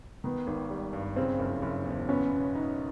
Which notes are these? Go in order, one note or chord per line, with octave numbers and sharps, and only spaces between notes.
D#3 B3
G#1
G3
G2
C#3 C4
F#1
F#1
E2
B3 C#4
B2
D#4